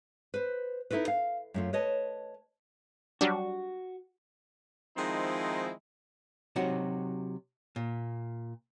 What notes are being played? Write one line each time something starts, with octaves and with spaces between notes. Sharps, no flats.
B4 C5
D#4 E4 F#4 A4 B4
F5
F#2 A3 F4
B4 C#5 D#5 A5
F#3 G3 D4 F#4
D#3 F3 G#3 C4 D#4 E4
C3 F#3 D#4 F#4
A#2